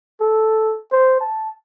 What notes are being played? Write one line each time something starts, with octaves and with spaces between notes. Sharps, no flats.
A4
C5
A5